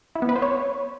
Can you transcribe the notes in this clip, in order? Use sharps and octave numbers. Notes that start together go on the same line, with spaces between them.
E4
B3
B4
C5
C#5